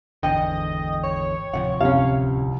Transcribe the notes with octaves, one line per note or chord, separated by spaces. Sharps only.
G#1 E2 D3 D#5 G5
C#5
D1 C3 F3 F#5
C2 C#4 F5